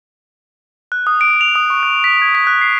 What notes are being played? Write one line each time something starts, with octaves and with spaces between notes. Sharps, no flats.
F#6
D#6
D7
F7
D#6
C#6
F#6
B6
G#6
B6
F#6
C7